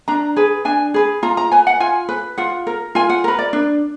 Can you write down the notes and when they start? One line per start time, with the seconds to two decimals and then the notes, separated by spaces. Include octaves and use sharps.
0.08 D4 A#5
0.36 G#4 B4
0.65 D4 G#5
0.94 G#4 B4
1.23 F4 A#5
1.37 A#5
1.52 B4 G#5
1.67 F#5
1.80 F4 G#5
2.09 B4
2.38 F4 F#5
2.67 A#4
2.95 F4 G#5
3.10 F#5
3.24 A#4 B4
3.39 D5
3.53 D4